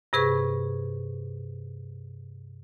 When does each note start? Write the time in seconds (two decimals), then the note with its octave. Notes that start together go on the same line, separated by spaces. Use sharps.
0.13 G2 C3 G#4 B4 C#6